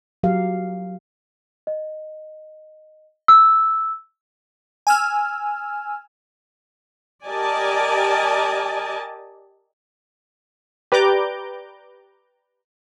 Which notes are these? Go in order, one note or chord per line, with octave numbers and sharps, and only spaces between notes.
F#3 G4 A#4 F5
D#5
E6
G#5 E6 F6
G4 A#4 D5 D#5 G#5 A5
G4 B4 D5 A#5 D6 G6